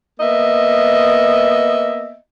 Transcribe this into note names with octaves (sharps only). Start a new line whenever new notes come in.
A#3 B3 D#5 E5